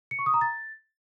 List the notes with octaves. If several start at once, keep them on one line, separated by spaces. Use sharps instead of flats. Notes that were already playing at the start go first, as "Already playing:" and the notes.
C#7
C#6
D#6
A#5
A6